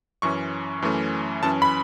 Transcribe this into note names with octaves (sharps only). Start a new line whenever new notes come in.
F#2 E3 C#4 C#6
F#2 E3 A3 C#4
F#2 E3 C#4 A5
B5